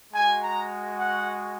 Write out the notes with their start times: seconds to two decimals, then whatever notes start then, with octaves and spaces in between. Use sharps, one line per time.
0.13 G#3 F#4 G#5
0.41 A#5
0.97 F#5